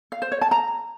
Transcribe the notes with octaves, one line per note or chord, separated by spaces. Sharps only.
F5
C5
C#5
A5
A#5